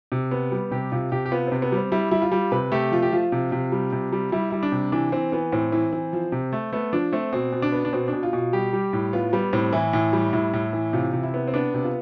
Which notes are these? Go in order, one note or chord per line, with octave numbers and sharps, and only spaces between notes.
C3
B3
G3
C3 G4
C3 F4
C3 G4
G4
B3 F4
C3 C4
B3
G3 C4
G3 E4
G3 E4
F4
G3
C3 B4
A3 G4
F3 F4
G4
F3 F4
C3
C3
G3
C3
G3
G3 E4
G3 E4
D4
C3
E3 D4
E3 C4
E3 B3
A2 C4
E3
E3
F3
C3
A3
A3 B3
F3 D4
A3 C4
B2 C4
B2
D4
B3
D4
B2 C4
B2 D4
F4
B2 F4
G3 G4
G3
A2
B3 F4
G3 B3
A2 C4
E3 E4
A2
G3
A2 E4
A2
E3
C3 F4
C3
E4
B3
C4
B3 D4
C3
F4